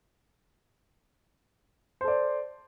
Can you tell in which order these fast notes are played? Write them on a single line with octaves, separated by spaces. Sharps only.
C5 A4 D5